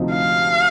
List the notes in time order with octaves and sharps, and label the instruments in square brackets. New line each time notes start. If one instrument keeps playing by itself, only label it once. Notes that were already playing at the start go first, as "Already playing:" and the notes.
Already playing: [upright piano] D2 C3 F3 C4 D#4
[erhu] F5